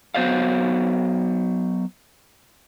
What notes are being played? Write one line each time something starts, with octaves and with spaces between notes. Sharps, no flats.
F#3 B3 C5 D5 F5